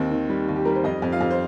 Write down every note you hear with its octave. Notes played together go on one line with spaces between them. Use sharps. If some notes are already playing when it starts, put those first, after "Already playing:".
Already playing: D#2 D#3 C4
D#3
G3
D#2
G4
G3 A#4
C5
F2 D#4 D#5
F2
F4 F5
F2
C5